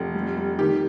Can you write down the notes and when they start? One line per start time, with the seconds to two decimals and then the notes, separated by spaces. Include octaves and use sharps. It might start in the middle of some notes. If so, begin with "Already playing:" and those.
Already playing: F1
0.14 G3
0.37 G3
0.59 D#3 G4